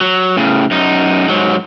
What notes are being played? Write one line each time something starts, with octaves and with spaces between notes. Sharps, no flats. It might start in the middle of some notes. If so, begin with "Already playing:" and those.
F#3
A2 C#3
F#2 D#4
G#2 F#3